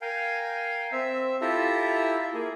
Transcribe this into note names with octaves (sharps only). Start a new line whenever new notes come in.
A#4 F5 G5 G#5
C4 E5
E4 F4 G4 A4 E5 A#5
E5
A#3 G#4